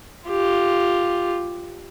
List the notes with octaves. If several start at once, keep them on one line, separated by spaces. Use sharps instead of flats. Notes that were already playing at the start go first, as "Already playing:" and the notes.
F4 G4